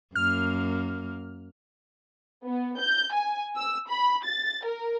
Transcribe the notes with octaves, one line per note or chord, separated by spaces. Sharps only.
F#2 A#3 F6
B3
G6
G#5
E6
B5
A6
A#4